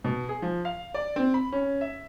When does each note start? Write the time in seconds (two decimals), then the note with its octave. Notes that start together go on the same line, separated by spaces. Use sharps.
0.04 B2
0.29 G#4
0.42 F3
0.65 F5
0.94 D5
1.16 C4
1.34 B5
1.52 C#4
1.81 E5